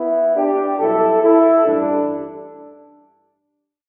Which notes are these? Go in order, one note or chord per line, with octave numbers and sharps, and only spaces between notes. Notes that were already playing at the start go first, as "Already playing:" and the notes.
Already playing: B3 E4
D4 G4
B1 B2 G3 E4 A4
E4 A4
A1 G2 G3 D4